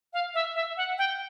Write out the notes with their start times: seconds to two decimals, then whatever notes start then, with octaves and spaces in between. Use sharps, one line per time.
0.13 F5
0.34 E5
0.55 E5
0.77 F#5
0.98 G5